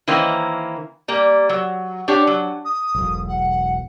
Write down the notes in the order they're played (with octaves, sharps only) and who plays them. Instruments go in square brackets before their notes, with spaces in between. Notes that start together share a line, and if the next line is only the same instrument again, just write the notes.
[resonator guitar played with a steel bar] D#3 E3 A#3 C#4 C5
G3 A#3
F#3
D4 G4 C#5
F#3
[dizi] D#6
[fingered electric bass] E1 B1
[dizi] F#5